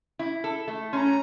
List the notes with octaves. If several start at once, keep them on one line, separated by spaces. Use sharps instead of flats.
E4
A4
A3
C#4 A#5 C6